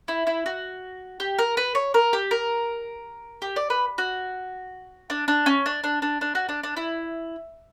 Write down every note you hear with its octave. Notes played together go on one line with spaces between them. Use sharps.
E4
E4
F#4
G4
A#4
B4
C#5
A#4
G4
A#4
G4
D5
B4
F#4
D4
D4
C#4
D4
D4
D4
D4
F#4
D4
D4
E4